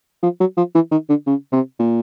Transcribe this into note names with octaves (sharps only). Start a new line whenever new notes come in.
F3
F#3
F3
E3
D#3
D3
C#3
C3
A#2